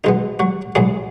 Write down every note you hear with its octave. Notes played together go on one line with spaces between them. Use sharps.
B1 B2 G#3 B3 D#4
F#3 F#4
B1 A2 F#3 G#3 G#4